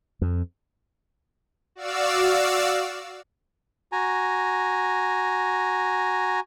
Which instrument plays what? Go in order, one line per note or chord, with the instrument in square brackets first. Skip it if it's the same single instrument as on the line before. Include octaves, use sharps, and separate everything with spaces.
[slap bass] F2
[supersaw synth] F#4 D5 F5 E6
[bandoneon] F#4 G#5 A#5